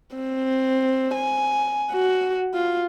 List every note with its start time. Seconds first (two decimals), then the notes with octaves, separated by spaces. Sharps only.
0.16 C4
1.14 G#5
1.92 F#4
2.55 F4